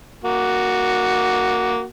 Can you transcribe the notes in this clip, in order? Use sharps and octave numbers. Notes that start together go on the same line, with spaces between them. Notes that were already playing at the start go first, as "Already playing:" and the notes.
A#3 F#4